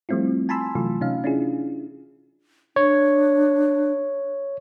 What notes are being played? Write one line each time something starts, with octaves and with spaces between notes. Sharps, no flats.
F3 G3 A3 C4 E4 F4
G#5 A5 B5 C6 E6
C3 E3 F#3 A3 F4
C3 C#4 D#4 F5
C#4 D4 E4 F4 G#4
D4 C#5